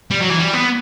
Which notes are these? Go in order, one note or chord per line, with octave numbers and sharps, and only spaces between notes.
G3
F#3
E3
G3
B3